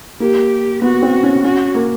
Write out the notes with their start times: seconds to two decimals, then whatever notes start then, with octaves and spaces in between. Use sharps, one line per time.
0.20 A#3 G4
0.82 B3 F#4
1.02 C4
1.23 C#4
1.44 C#4 F#4
1.75 A#3